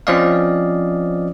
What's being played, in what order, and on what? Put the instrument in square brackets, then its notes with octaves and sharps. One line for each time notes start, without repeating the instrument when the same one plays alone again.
[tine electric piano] F3 C4 C#4 D5 D#5 F5